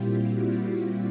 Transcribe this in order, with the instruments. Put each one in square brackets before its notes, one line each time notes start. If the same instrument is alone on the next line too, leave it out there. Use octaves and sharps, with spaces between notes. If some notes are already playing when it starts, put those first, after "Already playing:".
Already playing: [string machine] A#2 G3 C4 E4 F4 G4
F#4